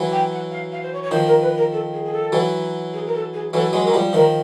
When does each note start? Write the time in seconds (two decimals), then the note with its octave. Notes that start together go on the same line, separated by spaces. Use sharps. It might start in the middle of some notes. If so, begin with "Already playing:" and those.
Already playing: E3 F#3
0.11 G5
0.31 F#5
0.51 F5
0.71 F5
0.82 C5
0.92 C#5
1.03 C#5
1.11 D#3 F3 C5
1.26 A#4
1.41 B4
1.57 A#4
1.72 A4
1.93 G#4
2.04 G#4
2.12 A4
2.32 E3 F#3
2.93 G#4
3.06 A#4
3.14 A4
3.33 G#4
3.53 E3 F#3 A4
3.73 F#3 G#3
3.83 F#3 A#4
3.93 F3 G3
4.13 D#3 F3 A#4